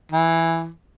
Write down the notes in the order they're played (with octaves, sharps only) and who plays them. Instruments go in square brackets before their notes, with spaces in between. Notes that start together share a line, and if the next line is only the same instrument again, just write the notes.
[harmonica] E3